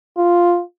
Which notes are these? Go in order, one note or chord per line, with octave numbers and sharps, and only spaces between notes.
F4